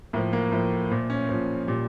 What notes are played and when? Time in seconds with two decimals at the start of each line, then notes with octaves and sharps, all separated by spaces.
0.13 A2 A#3
0.17 F3
0.33 A#3
0.52 A2 F3 A3
0.90 A#2 F3
1.10 C#4
1.29 A#2 F3
1.67 A#2 G3